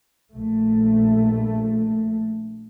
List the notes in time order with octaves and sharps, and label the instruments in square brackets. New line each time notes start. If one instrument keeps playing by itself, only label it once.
[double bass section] A#1 A3